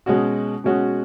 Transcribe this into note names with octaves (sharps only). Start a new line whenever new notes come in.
B2 G#3 C#4 F#4
B2 G#3 C#4 F#4